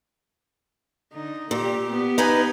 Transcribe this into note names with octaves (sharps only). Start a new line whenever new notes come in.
D3 D#4
A#2 A#3 G4
B3 G4
D#4 B4 G#5